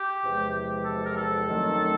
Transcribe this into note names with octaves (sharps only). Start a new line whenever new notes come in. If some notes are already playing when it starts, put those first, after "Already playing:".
Already playing: G4
E2 C3 F3 G#3
A4
A#4
A4
F#2 D#3 F#3 A3 C4